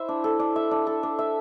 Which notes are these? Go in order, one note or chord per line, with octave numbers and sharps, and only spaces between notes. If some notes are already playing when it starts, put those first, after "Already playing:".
Already playing: E4 C5 E5
D4
A4
D4
E5
D4
A4
D4
E5